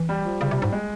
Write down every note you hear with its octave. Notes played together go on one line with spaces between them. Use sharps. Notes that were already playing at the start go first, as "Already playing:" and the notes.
Already playing: E3
G3
F3
C#3 G3
C3
G3
G#2
G#3